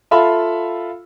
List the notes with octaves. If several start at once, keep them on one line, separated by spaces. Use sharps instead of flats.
F4 A4 E5 F5 B5